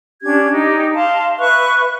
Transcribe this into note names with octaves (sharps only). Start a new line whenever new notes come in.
C#4 D4 G4 G#6
D#4 G4
F5 A5 C6
B4 E5 C#6 F#6